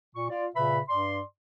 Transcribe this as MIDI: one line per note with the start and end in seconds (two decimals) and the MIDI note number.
0.14 0.27 46
0.14 0.27 85
0.29 0.45 65
0.29 0.45 74
0.55 0.79 46
0.55 0.79 49
0.55 0.79 71
0.55 0.79 76
0.55 0.79 83
0.88 1.20 43
0.88 1.20 74
0.88 1.20 84